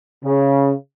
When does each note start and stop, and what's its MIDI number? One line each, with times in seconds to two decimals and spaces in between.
0.24 0.72 49